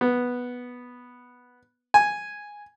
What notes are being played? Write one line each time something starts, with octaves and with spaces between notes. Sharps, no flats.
B3
G#5